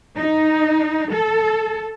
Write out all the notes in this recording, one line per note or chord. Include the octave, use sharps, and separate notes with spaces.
D#4
A4